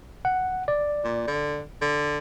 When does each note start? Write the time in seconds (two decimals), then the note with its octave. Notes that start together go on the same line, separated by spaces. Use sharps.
0.25 F#5
0.68 D5
1.04 A#2
1.27 D3
1.81 D3